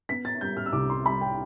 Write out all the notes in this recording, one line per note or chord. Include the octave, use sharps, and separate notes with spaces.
B3 B6
A6
G3 G6
F6
E6
C2 D6
C6
G3 B5
G5